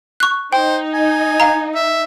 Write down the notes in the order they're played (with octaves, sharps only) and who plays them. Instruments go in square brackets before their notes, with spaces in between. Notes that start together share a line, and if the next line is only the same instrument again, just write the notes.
[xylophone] C#6 F#6
[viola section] D#4 [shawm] C5 [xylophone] G5
[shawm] G#5
[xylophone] F5 A#5
[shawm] E5